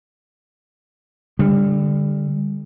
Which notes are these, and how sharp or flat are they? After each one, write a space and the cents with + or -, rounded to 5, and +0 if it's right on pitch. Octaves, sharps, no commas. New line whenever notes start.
D3 +0 G3 +30